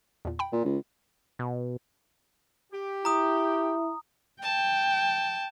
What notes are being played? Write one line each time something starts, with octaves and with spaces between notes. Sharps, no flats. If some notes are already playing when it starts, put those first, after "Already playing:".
E2 A#2
G5 B5
A#2
C#2
B2
G4
E4 A#5 D#6
G5 A5